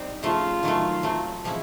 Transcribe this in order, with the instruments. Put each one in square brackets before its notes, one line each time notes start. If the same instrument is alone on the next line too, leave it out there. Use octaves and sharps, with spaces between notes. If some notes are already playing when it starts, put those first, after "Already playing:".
Already playing: [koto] G3 C4 D#4
[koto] C#3 F3 A3 [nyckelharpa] F4
[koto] D#3 F#3 A3
F#3 A3 C4
C3 F3 G#3 C#4 E4